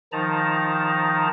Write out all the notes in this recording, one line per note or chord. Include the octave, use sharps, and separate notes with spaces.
D#3 F3 D#4 A5 A#5